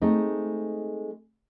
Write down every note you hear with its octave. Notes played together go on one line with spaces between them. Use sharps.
G#3 A3 C4 D#4